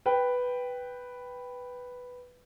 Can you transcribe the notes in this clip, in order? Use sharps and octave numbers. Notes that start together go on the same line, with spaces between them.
B4 G5